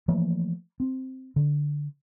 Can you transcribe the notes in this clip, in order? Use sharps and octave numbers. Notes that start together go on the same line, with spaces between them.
E3 F3 A3 A#3
C4
D3